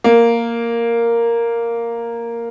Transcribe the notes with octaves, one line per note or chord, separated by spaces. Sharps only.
A#3